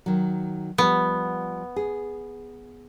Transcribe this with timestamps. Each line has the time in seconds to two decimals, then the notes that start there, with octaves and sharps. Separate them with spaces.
0.06 D#3 F#3
0.78 F3 G3 B3
1.76 G#4